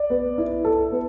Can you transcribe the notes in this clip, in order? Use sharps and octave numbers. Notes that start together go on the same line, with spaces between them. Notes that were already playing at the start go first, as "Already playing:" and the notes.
Already playing: D5
B3
E4
A4
B3